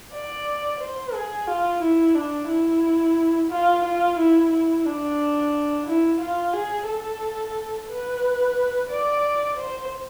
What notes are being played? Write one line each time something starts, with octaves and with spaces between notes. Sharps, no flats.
D5
C5
G#4
F4
E4
D4
E4
F4
F4
E4
E4
D4
E4
F4
G#4
A4
B4
D5
C5